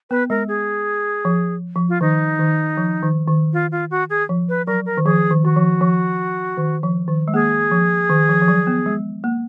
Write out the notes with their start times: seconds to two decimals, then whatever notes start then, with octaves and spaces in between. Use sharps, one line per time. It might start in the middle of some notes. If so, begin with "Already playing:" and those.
0.10 B3 B4
0.30 G#3 A#4
0.48 G#4
1.25 F3
1.76 F3
1.89 F4
2.01 D#3 D#4
2.39 D#3
2.77 F3
3.03 D#3
3.28 D#3
3.53 F4
3.72 F4
3.91 F#4
4.10 G#4
4.29 F3
4.49 B4
4.67 F#3 A#4
4.86 A#4
4.97 D#3
5.05 F3 G#4
5.31 D#3
5.43 D#3 F#4
5.56 F3
5.81 F3
6.57 D#3
6.83 F3
7.08 D#3
7.28 G#3
7.34 A#3 G#4
7.71 F3
8.10 D#3
8.29 F3
8.41 F3
8.48 F#3
8.67 B3
8.86 G#3
9.24 A#3